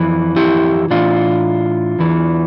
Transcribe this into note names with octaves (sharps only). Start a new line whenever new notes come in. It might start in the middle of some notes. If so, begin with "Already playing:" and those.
Already playing: F2 E3
E4 G4
A2 E3 D4 F4
E2 E3